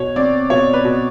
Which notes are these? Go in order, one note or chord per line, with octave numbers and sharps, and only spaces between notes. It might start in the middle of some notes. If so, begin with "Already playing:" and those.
Already playing: B2 C#5
C4 D5
B2 C#5
B4
B2